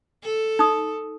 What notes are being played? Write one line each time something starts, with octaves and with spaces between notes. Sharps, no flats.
A4
D#4 D#6